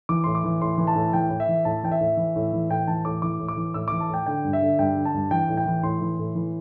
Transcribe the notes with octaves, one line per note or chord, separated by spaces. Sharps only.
E3 D6
A2 C6
D6
E3
A2 C6
E3
A5
A2
E3 G5
A2
E5
E3
A2 A5
E3 G5
E5
A2
E3
A2
E3
A2 G5
E3 A5
A2 D6
E3 D6
A2
D6
E3
A2 E6
E3 D6
A5
A2 G5
D3 G5
G2
E5
D3
G2 G5
D3
A5
G2
E3 G5
A2
G5
E3
A2 C6
E3
A2
E3